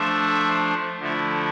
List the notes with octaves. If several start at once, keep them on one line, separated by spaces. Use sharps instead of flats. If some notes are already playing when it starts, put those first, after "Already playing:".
Already playing: F3 A3 D4 C5 E5
D3 F3 A3 E4